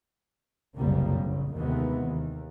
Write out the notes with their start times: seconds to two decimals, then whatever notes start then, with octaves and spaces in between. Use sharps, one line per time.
0.76 F#1 C2 F2 C#3 G3 A#3
1.21 A#1 C#3
1.55 D#2 C3 D#3 E3 G#3 B3
2.05 D#2